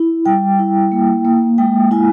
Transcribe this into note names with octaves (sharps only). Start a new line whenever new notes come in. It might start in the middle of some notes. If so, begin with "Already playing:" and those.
Already playing: E4
G3 G5
E4
A#3
A#3
G#3 G5
E4 G#5